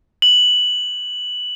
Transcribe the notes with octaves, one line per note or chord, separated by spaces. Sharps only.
F#7